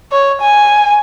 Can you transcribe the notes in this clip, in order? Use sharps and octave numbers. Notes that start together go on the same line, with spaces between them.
C#5
G#5